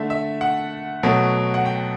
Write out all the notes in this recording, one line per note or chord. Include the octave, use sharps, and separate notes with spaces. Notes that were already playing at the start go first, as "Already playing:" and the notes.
Already playing: D3 A3 E5
E5
F#5
B2 F#3 A3
F#5
G5